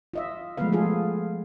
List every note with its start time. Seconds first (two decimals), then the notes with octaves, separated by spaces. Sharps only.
0.14 F4 D#5 E5
0.57 F3 G#3 A3 B3 B4 F5
0.72 F4 G#4 A4